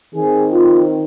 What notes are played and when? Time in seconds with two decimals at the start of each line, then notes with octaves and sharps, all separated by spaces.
0.14 D#3 C4 G#4
0.53 F4